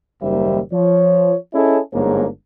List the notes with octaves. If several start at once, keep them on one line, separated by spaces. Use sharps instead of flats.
F#1 D#2 D#3 G3 C5 E5
F3 C#5
C#4 E4 G#4 A4 C#5 D#5
G1 G#2 A#3 D4 G#4 C#5